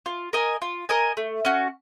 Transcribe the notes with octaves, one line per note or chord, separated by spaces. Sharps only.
F4
A#4 D#5 G#5
F4
A#4 D#5 G#5
A3
C#4 F#4